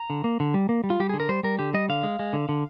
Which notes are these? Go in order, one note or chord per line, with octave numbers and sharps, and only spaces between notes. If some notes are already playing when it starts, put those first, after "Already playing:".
Already playing: A#5
D3
A#3
D3
G3
A#3
G3
F4
G3 G4
D3 G#4
A#4
G3 C5
G3 A#4
D3 G4
G3 D#5
D3 F5
G#3
G#3
D3
D3